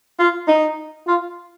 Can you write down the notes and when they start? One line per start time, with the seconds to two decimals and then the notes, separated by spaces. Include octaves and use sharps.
0.18 F4
0.48 D#4
1.07 F4